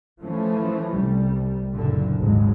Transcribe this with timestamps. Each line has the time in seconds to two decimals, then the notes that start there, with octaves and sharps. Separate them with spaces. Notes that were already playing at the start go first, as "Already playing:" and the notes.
0.22 E3 F3 A3 C#4
0.95 C2 G3
1.74 F#1 A#2 D3
2.19 G#1 D#2 F#3 G#3